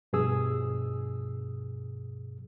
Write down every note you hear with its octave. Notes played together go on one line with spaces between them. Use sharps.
G2 B2 F3 G#4 D#6 E6